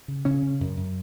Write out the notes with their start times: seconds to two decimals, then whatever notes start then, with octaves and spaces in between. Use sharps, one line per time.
0.08 C#3
0.25 C#3 C#4
0.42 C#3
0.60 F#2
0.77 F#2